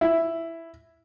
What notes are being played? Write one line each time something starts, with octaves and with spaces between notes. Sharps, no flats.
E4